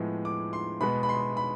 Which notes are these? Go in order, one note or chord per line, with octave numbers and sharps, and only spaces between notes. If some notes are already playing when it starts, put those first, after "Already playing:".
Already playing: A2 F3 G#3 B3
D6
C6
B2 G#3 B3 B5
B5
C6
B5